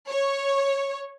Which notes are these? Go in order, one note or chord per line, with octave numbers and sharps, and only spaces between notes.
C#5